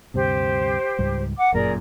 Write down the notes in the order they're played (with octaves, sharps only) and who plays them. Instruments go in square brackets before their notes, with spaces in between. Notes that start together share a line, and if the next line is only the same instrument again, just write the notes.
[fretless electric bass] D2 G2 C3 [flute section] G4 C5
[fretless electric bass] C#2 G#2 G3
[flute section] F#5 D6
[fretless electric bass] G1 F#2 A#2 [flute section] G#4 A#4 D5